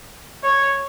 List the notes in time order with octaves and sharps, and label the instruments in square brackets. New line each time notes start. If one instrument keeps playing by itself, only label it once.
[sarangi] C#5